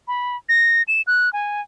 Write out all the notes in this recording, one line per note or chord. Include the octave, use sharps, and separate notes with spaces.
B5
A#6
E7
F#6
G#5